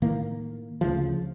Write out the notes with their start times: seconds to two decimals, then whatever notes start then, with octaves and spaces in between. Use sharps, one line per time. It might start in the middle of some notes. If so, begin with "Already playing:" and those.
0.02 A2 D#3 A#3
0.81 D2 C#3 F3